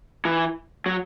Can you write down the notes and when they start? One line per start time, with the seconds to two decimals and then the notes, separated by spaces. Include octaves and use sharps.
0.25 E3
0.86 F#3